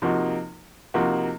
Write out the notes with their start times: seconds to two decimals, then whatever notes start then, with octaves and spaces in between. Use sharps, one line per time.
0.02 C3 F3 A#3 D#4 F#4
0.94 C3 F3 A#3 D#4 F#4